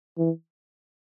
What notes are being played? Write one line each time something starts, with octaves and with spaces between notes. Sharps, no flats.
E3